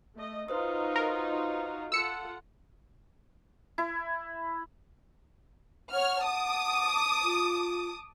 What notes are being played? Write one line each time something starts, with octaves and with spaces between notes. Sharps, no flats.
A3 D#5
D#4 F4 F#4 B4 C5 D#6
A#4
F4 A4 F#5 E6 C#7
E4
C#5 F#5 F6
A5 D6 D#6
F4